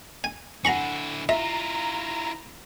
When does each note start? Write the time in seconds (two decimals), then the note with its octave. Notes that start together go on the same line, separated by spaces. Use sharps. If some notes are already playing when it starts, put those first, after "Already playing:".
0.24 G#5
0.65 D3 E4 F#5 G#5 A#5 B5 C#6
1.29 E4 F4 E5 A#5